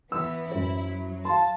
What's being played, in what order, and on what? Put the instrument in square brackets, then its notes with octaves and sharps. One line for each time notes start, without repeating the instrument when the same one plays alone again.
[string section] E3 B3 [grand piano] E6
[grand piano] F#2 C5 [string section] E4
[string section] F#3
[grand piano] F5 C6 [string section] A5